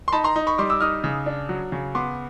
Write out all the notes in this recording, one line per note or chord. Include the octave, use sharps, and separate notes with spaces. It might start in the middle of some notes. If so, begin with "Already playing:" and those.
C6
D#4 A5 B5
A#5 C6
D#4
B5 C#6
G3 C6 D6
D6 E6
D#4 D#6 F6
C#3
D4
F#3
C#3
B3 C6 D6